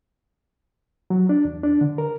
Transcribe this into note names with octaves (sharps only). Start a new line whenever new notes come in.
F#3
D4
E2
D4
D3
A#4